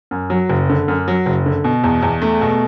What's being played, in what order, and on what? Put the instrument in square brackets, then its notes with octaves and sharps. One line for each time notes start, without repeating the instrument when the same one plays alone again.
[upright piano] F#2
F#3
F#1
D3
F#2
F#3
F#1
D3
B2
E2
E2
A3
B2